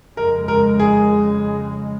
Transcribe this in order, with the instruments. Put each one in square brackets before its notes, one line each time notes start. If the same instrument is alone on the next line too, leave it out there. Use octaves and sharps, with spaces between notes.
[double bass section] F2 C#3 G#3 [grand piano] A#4
[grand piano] A#4
G#4